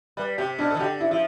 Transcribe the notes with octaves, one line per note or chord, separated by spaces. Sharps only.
G3 B4
C3 G4
B2 D4
A4
E3
D3 G4
E4
F3 E4